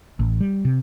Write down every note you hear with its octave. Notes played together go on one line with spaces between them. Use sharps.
A1
G3
C3